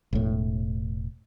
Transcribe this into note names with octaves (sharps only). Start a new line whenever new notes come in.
E1 A2